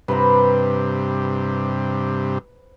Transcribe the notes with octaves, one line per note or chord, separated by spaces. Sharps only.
G2 C3 B4 C5 A#5